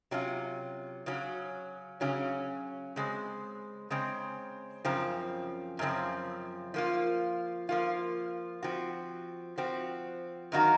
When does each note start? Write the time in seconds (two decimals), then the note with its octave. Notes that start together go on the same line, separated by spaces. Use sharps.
0.11 C3 F#3 C#4 F4
1.06 C#3 F#3 C#4
2.01 C#3 F#3 C#4
2.96 C#3 G#3 C4
3.90 C#3 G#3 C4
4.85 F#2 C#3 F3 C4
5.79 F#2 C#3 F3 C4
6.74 F3 A#3 F4
7.69 F3 A#3 F4
8.63 F3 C4 F#4
9.58 F3 C4 F#4
10.52 F#2 D#3 A#3 D#4 F#4